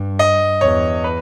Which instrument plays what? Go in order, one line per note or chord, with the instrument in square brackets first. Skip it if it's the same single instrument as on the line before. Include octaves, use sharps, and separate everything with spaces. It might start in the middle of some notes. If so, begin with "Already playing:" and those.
Already playing: [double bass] G2
[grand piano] D#5
[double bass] E2 [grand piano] C#5
[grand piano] B4